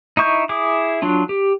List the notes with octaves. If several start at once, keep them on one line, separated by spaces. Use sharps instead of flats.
D#4 E4 C#6 G6
E4 G#4 D6
F#3 D4 F4
G4